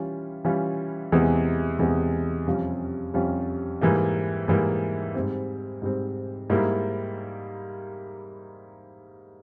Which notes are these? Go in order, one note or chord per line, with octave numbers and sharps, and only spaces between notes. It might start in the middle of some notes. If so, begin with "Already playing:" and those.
Already playing: E3 G3 C#4 F4
E3 G3 C#4 F4
E2 C3 E3 G#3
E2 C3 E3 G#3
F2 C3 G3 C#4 F4
F2 C3 G3 C#4 F4
G#2 E3 G3 A#3
G#2 E3 G3 A#3
G#2 G3 C4
G#2 G3 C4
G#2 G3 A#3 E4